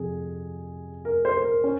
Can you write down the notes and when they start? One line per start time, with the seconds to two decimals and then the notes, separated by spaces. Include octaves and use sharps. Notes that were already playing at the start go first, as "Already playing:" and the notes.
Already playing: F2 C3 G#4
1.05 A#4
1.25 C5
1.37 C5
1.44 A#4
1.64 C#4